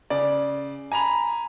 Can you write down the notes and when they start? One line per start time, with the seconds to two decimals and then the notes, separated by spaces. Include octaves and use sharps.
0.10 C#3 D5
0.92 G#5 A#5 B5 F7